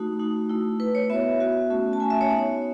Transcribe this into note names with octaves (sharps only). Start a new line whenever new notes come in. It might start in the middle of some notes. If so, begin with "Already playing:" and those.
Already playing: A3 D#4 F#4
A3 D#4 F#4
A3 E4
A3 E4 B4
C#5
B3 F#4 E5
B3 F#4
A3 C#4 F#4
A5
A3 C#4 F#4 G#5
E5
C#5
B3 D#4 F#4